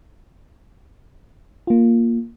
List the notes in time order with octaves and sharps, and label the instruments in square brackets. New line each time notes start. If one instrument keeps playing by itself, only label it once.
[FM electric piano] A#3 F4